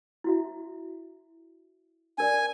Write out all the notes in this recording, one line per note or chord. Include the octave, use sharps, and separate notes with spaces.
E4 F#4 E5
D4 A#4 D5 G#5